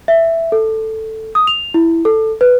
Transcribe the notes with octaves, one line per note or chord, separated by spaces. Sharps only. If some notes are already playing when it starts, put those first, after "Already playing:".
E5
A4
D#6
F7
E4
A4
B4